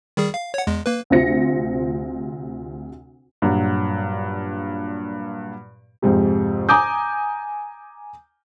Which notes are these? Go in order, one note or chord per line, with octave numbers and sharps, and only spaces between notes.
D#3 G3 G#4
F5
C#5 F#5
E2 G#3
A#3 B4
D2 C3 F4 C5 A#6 C#7
G2 A#2 F#3
F2 G#2 C3
G#5 A#5 D6 D#6 G6